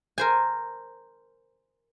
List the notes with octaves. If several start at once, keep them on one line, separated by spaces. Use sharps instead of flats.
A#4 C5 G#5